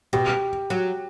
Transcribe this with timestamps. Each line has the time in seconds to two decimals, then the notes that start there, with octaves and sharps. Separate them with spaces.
0.13 B2 G4
0.70 F#3